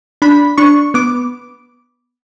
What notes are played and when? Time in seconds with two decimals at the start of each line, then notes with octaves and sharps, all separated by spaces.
0.22 D4 B5
0.58 D4 C#6
0.94 B3 D6